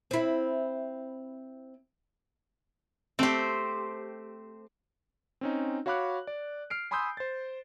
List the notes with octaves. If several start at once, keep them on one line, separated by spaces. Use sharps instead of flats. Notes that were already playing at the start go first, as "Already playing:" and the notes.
C4 E4
A3 C4 G4 C5
C4 C#4 D#4
F#4 C#5 F5 B5 D6 F#6
D5
F6 C7 D7
G#5 B5 C6 D#6 E6 G6
C5 A6